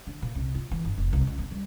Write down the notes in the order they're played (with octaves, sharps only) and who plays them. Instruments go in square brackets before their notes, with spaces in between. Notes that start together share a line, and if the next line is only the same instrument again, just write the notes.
[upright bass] D3
A#2
C2
F4
E3
G1
F1
C2
C#2
B3
G3